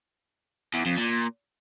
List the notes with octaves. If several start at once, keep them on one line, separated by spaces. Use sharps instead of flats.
E2
F2
A#2